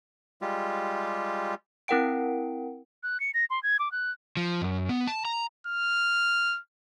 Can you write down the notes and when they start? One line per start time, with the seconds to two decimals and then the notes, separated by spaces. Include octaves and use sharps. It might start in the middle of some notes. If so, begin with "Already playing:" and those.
0.42 G3 G#3 F4 G4
1.88 C4 E4 A#4 F#5 G5 D7
3.03 F#6
3.20 C#7
3.34 A#6
3.50 C6
3.63 G#6
3.79 D6
3.92 F#6
4.37 F3
4.62 F#2
4.89 B3
5.07 A5
5.25 A#5
5.67 F6